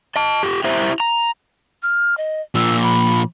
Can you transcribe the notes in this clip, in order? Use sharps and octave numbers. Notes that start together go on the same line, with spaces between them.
D#5 A5
F4 G4
E4 G4 C5 E5 A#5
A#5
F6
D#5
A#2 F3 E6
B5